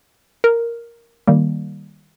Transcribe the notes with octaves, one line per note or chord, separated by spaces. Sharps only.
A#4
D#3 G3 A#3